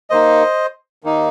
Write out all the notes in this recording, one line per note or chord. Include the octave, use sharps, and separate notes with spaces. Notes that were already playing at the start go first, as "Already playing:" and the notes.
D#2 D#3 A#3 D#4 C5 D#5
D#2 D#3 A#3 D#4